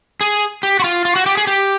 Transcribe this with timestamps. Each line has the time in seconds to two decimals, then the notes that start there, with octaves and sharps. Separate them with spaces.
0.21 G#4
0.63 G4
0.80 F#4
0.84 F4
1.05 F4
1.16 F#4
1.26 G4
1.37 G#4
1.47 G4